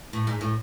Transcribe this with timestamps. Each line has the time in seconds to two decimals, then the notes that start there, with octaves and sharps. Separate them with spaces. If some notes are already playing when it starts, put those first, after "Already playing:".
0.13 A2
0.27 G#2
0.41 A2